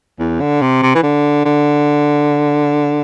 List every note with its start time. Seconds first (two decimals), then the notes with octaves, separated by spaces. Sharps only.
0.20 E2
0.41 D3
0.62 C3
0.83 C3
0.95 E3
1.03 D3
1.45 D3